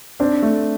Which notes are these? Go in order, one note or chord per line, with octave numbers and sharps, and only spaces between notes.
C4 D4
A3